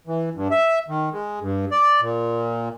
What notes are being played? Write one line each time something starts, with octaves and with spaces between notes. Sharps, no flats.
E3
G2
E5
D#3
G#3
G2
D5
A#2